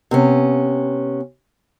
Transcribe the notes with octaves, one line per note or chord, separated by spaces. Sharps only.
C3 B3 C#4